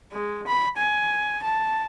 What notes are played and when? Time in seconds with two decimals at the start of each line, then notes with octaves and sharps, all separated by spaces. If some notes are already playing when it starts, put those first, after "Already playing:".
0.12 G#3
0.47 B5
0.77 G#5
1.43 A5